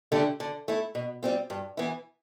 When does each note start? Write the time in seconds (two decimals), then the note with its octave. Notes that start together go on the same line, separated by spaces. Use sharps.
0.12 D3 A3 D4 G4
0.40 D3
0.68 A3 E4
0.95 B2
1.23 G3 C4 F4
1.50 G2
1.77 E3 B3 E4